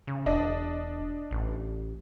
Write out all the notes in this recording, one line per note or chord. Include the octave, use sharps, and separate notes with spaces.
C#3
E1 D4 D#5
A1